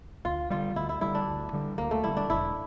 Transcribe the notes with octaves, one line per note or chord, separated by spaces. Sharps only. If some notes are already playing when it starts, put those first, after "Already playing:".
D2 F4
D3 G3 F4
D2 E4
E4
D3 G3 E4
D4
D2
D3 G3
D2 A#3
A3
D3 G3 E4
D4
E1 E4